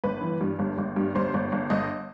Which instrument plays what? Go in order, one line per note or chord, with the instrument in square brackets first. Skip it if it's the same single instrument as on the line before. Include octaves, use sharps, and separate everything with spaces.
[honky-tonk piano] G1 B4
E3
G2
G1
G1
G2
G1 C5
G1
G1
G1 D#5